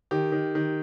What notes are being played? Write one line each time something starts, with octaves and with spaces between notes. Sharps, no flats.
D#3 G4
D#3
D#3